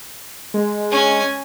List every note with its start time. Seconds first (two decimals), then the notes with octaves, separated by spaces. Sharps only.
0.54 G#3
0.92 C#4 G#5